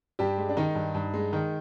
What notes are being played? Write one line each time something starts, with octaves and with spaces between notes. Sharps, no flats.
G2 G3 G4
G#3
D4
D#3 D#4
G2
G2
G#3
D#3